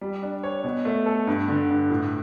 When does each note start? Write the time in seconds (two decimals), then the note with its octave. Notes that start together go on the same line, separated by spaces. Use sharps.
0.01 G3
0.22 D4
0.43 C#5
0.64 B2
0.85 A3
1.06 A4
1.27 G2
1.48 D3
1.69 G2
1.90 A2